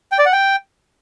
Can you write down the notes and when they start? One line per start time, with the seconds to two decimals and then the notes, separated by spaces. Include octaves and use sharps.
0.12 G5
0.19 D5
0.26 F#5
0.33 G5